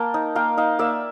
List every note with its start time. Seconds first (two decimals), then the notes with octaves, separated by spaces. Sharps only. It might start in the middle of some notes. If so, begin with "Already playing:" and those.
Already playing: A#3 G5 A5
0.14 D#4
0.35 A#3 F5 G5
0.57 D#4 D#5 F5
0.79 A#3 D5 E5